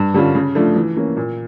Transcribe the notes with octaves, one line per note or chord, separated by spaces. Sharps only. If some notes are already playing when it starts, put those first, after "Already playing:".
Already playing: G2
D3 G3 C#4 F4
C#3
F3 A3 D4 F4
E3
A#3 C#4
A#2